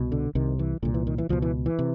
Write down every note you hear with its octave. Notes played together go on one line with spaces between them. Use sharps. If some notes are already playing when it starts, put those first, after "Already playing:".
Already playing: C2 B2
D3
C2 C3 D#3
E3
C2 A#2 D3
E3
D#3
E3
C#2 B2 F3
E3
E3
C3